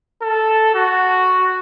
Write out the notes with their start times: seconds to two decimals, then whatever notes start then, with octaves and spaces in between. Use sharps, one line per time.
0.22 A4
0.75 F#4